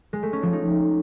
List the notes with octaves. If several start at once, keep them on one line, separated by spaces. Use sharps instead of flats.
G#3
A3
C#4
F3
D#4